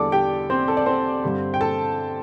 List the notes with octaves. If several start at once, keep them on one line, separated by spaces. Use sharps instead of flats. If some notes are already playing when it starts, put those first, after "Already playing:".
Already playing: E2 D3 G3 A4 D5 D6
G4 G5
C4 C5
A4
D5
C4 C5
G2 D3 G3
G5
A4 A5